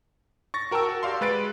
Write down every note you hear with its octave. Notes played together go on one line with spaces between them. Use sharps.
C#6 A6 A#6
F#4 A#4 G5 A5 E6
F#4
G4 D5 F5 C6
G#3 B4 A6 D7